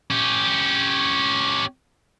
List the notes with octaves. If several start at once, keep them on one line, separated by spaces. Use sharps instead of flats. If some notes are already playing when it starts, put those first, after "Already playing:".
C#4 G4